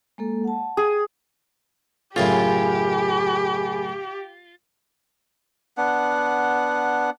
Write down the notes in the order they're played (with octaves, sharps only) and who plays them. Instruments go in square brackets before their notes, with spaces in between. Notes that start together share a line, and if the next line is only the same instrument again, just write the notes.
[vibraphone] G#3 A#3 A4
F#5 A5
[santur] G#4
[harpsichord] F#2 A2 C#3 [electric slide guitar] F4 [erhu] G4 [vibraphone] G#4 G#5 B5
[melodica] B3 D4 F#5